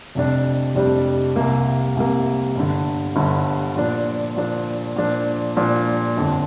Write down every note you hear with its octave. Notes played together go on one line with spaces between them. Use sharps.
F1 F2 C3 G3 D4
F1 F2 C3 G3 D4
C2 C3 A#3
C2 C3 A#3
G1 G2 D3
G1 G2 D3
A#2 F3 D4
A#2 F3 D4
A#2 F3 D4
A#2 F3 D4
G1 F2 D3